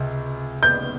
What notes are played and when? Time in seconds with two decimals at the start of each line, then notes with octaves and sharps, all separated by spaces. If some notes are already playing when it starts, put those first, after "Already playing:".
Already playing: C#2 C3
0.63 G6